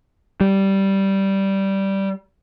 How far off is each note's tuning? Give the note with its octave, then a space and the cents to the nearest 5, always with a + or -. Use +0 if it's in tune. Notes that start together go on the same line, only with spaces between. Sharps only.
G3 -10